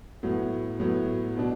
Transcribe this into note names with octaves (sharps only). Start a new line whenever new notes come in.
A2 F#3 B3
A2 F#3 B3
B2 F#3 D4